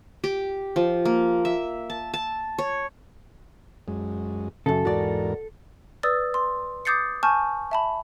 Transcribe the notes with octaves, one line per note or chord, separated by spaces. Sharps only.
G4
F3
A#3
E5
A5
A5
C#5
F#2 G#3
F#2 C#3 A4
E2 G#2 F#4 A#4 D5
B4 D5 D#6 E6 A6
C6
D6 D#6 G6 A6 C7 C#7
G#5 A5 C#6 F6 G6
E5 A5 B5